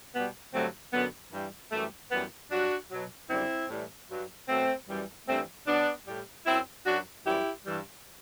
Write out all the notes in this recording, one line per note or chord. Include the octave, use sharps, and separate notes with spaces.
B2 G3 B3
G2 D3 F#3 A3 C4
F#2 D3 F#3 B3
G2 E3 G3
F#2 E3 G3 A3
F#2 E3 G3 B3
G2 F#3 D4 F#4
B2 F#3
F#2 D3 G3 C4 E4
A2 E3 G3
G2 F#3
B2 F#3 A3 C4
F#2 E3 G3
G2 E3 G3 A3 C4
B2 F#3 B3 D4
A2 G3
F#2 F#3 C4 E4
F#2 F#3 D4 F#4
F#2 E3 G3 E4 G4
G2 E3 G3